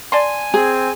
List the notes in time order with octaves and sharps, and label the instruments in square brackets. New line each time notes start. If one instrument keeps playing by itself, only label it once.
[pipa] D5 A5 C6 [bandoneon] G#5
[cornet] C4 [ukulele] G#4